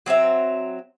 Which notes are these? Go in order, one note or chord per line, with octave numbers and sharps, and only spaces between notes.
F#3 C4 D#4 E5